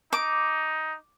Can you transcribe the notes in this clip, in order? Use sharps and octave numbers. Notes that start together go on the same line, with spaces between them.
D#4 D6